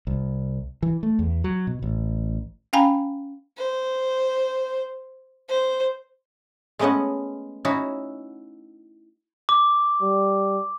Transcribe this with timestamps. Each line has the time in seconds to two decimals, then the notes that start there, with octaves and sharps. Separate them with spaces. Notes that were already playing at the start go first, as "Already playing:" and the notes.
0.07 C2
0.83 E3
1.03 A3
1.19 E2
1.44 F#3
1.67 B2
1.82 A1
2.73 C#4 F5 G5 G#5 A#5 B5
3.57 C5
5.49 C5
6.79 G#3 A3 B3 C#4 D#5 F#5
7.65 C#4 D#4 E4 F#4
9.49 D6
10.02 G3